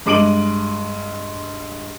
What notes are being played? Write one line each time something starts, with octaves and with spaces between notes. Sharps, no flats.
G2 G#3 D6 D7 D#7 F#7